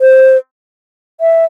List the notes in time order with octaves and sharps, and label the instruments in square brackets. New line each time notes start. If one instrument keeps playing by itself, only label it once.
[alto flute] C5
E5